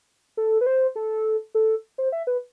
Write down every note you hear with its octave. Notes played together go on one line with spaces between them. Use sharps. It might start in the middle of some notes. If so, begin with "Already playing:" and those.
A4
B4
C5
A4
A4
C5
E5
B4